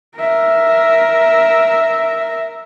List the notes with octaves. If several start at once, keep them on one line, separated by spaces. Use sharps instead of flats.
A#4 E5